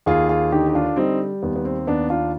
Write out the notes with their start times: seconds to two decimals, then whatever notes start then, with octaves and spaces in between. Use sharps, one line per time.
0.06 D#2 F4 G#4
0.29 F4 G#4
0.51 D3 D#4 G4
0.69 G4
0.75 D4 F4
0.96 G3 C4 D#4
1.43 D#2 B3
1.56 B3
1.65 C4
1.87 D#2 B3 D4
2.09 D4 F4